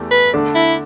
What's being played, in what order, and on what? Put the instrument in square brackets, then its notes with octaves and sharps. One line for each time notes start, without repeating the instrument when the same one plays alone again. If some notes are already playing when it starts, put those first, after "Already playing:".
Already playing: [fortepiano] E2 E3 A3 G4
[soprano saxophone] B4
[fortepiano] D3 A3 D4 A4 D5
[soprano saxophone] E4